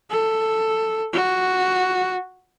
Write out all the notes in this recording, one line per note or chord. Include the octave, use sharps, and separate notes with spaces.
A4
F#4